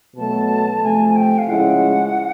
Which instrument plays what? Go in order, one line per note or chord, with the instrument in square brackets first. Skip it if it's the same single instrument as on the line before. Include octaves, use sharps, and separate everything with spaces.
[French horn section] B2 F#3 A3 [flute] A5
[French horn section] C3 F3 A3 [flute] G#5
[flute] G#5
G5
F5
[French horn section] C#3 F3 G#3 C#4 E4 [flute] F#5